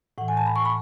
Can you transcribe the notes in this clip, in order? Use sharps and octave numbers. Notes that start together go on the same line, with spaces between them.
A2 E3 F#5
G#5
A5
B5
C#6
B5